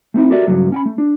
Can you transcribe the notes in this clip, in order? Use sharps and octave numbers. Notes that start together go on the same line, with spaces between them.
A3 C4 D#4 E4
F#4 G4 A4 A#4 D5 E5
G2 C#3 F#3 A3
C#4 G5 B5
A3
D4